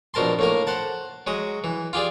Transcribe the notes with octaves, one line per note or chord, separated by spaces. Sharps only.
A#1 B2 A#4 A5 C6
A2 A#3 A#4
C5 F#5 A5
F#3 G#3 D#6
E3
F4 G4 G#4 D5